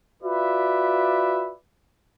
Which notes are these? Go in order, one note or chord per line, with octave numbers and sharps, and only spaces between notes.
F4 F#4 B4 D5 E5